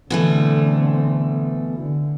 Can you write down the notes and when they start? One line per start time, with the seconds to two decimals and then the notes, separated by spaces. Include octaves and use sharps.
0.10 B2 D3 E3 A3 C4
1.78 D3